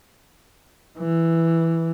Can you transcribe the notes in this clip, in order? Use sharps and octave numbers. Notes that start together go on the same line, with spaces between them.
E3